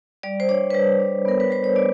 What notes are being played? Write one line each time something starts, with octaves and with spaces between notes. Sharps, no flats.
G3 D5
C5
D4 C#5
B4
G3 C5
D4
B3 A#4
B4
G3 C5
C#5
D4 D5